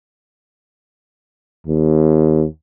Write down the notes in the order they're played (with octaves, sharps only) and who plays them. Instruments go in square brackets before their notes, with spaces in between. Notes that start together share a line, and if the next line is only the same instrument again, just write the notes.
[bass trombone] D#2